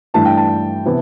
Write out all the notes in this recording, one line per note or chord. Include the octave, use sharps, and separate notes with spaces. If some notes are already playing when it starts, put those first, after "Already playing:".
G2 E3 A3 D4 A5
G5
A5
C3 E3 B3 E4